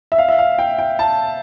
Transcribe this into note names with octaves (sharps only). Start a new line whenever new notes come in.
E5
F5
E5
F5
G5
G5
A5